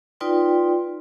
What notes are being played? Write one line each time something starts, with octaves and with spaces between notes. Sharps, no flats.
D#4 F4 B4 D5 G5 C6